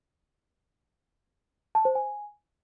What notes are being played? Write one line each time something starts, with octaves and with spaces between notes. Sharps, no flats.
A5
C5
G#5